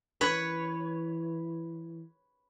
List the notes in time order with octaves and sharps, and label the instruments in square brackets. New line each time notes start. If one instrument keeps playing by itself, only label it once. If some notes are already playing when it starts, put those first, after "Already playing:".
[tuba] E3 [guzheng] B4 C#5